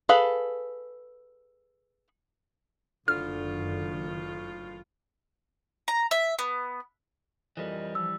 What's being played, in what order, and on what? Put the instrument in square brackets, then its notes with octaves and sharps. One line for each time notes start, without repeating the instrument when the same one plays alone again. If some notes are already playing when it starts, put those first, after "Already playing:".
[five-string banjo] G#4 A4 B4 F5
[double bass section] F#1 D#3 [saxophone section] D2 A2 F4 [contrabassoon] D3 [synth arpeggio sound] F6
[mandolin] A#5
E5
B3
[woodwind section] F2 A#4 D#5 [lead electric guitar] E3 G3
[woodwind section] F3 [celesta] E6